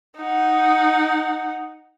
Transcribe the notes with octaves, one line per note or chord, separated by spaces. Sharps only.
D#4 F#5